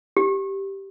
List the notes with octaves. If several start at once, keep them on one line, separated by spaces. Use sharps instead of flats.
G4